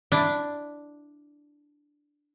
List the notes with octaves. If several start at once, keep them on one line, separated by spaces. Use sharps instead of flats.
D4 E4